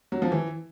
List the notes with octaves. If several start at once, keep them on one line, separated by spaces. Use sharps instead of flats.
F#3
F3
E3